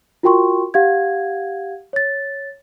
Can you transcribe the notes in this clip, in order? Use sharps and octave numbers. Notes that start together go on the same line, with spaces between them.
F4 F#4 A#4 G5 C6 C#6
G4 F5 F#5 G#6
C#5 A6